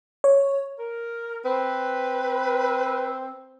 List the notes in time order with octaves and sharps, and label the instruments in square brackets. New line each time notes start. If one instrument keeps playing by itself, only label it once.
[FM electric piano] C#5
[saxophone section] A#4
[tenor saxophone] C4 [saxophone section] B4